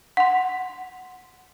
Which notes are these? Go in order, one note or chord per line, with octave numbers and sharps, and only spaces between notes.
F#5 C6